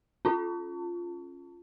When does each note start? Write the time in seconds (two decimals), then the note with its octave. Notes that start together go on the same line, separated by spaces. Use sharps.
0.25 C#4 F4